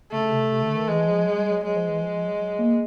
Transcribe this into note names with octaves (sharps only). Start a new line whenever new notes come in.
C#3 A3
C3
C3
D3
D#3
E3 G#3
F3
F#3
G3
F#3
F#3 G#3
F3
E3
F3
F3
F#3
F#3
A#3